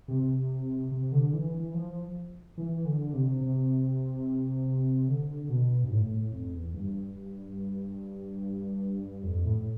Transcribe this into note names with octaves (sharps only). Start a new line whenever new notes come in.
C3
C3
D3
E3
E3
F3
E3
D3
C3
C3
D3
B2
G2
A2
A2
F2
E2
G2
F2
A2